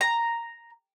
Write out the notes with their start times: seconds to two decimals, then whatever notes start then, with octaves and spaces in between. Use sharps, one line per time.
0.01 A#5